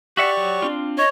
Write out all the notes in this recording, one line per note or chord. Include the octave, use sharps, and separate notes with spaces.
F#4 G4 D5 E5 F#5 C#6
F#3
C4 D4 F4
C#5 D#5